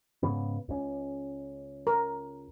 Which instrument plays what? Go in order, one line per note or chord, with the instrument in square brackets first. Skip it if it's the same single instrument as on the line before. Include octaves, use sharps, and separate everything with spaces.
[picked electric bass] G#2 C#3 B3
C#2 C#4
[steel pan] A#4